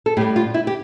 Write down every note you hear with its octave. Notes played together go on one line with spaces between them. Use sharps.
A4
A2 G3 G4
F4
E4
G4